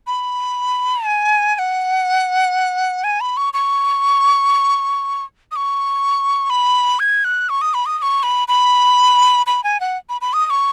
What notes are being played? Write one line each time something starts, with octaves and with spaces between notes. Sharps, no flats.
B5
G#5
G#5
F#5
G#5
B5
C#6
C#6
D#6
C#6
B5
G#6
F#6
C#6
D#6
B5
D#6
D#6
C#6
B5
B5
B5
G#5
F#5
B5
B5
D#6
D#6
C#6